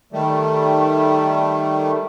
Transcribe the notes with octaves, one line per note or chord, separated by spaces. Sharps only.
D#3 G3 A3